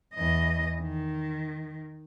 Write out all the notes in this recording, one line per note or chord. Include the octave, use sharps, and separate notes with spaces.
E2 D#5
D#3